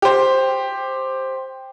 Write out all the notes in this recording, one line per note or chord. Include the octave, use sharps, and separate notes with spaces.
G4 C5